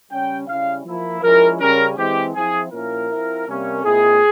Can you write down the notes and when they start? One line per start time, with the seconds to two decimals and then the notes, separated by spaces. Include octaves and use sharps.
0.11 C#3 G3 C#4 G5
0.48 C#3 G3 C#4 E4 F5
0.85 F3 A#3 E4
1.22 F3 G#3 C#4 E4 A#4
1.60 C#3 G3 C#4 A#4
1.97 E3 G#3 C4 G4
2.35 F3 C4 E4 G#4
2.72 A#2 F3 A#3 C#4 E4 A#4
3.10 F3 C4 E4
3.47 C3 G3 A#3 C#4
3.84 A#2 G#3 C4 E4 G#4